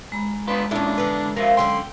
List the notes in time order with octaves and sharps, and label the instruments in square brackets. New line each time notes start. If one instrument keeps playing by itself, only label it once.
[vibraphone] G#3 A#5 B5
[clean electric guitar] B3 D4 F4 [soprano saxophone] B4
[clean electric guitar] E2 A#2 A4 [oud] C#4 E4 [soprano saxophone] D4
[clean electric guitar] E2 [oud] D3 B4
[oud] F3 F#3 F4 [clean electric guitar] A#4 C5 E5
[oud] F#2 D3 C#4 [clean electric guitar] G5 [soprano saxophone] C6